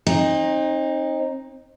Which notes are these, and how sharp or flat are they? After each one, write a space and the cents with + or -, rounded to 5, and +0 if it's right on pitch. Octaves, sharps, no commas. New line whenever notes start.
C4 +35 D#4 +0